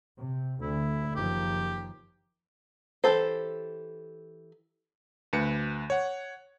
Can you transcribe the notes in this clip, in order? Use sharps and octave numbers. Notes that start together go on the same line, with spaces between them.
C3
D2 E4
F#1 D#3 F3 G4
E3 G#3 G4 A4 C5
D2 B4 C#7
C#5 F#5